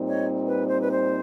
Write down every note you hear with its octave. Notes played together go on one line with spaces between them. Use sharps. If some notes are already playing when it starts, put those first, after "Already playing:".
Already playing: A#2 G3 C4 D#4
C#5 D#5
B4
C5
B4
C5